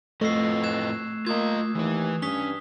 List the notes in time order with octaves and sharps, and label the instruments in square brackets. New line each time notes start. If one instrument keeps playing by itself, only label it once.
[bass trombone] F2 [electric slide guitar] A2 B4 D#5 [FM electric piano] A3 [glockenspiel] C#6 E6 C7
[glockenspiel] F#6 G#6 E7
[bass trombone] A#3 [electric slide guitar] F4 D#5 [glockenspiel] D#6 G#6
[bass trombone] D#2 [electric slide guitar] E3 B4
[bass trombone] G2 [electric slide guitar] C#4 [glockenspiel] D#6 B6 G7